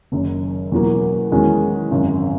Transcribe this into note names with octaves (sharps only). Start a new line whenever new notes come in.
F#1 F#2 D#3
E2 B2 F#3 A#3
E2 D#3 G#3 C#4 F#4
G#1 F#2 C#3